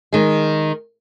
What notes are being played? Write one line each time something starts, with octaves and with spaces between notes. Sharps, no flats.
D#3 G#3